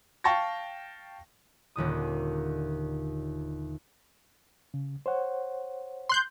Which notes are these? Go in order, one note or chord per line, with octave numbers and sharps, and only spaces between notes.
F5 G5 A5 C#6 A#6
D#1 D#2 D3 D#6
C#3
C5 C#5 F#5
C6 F#6 G6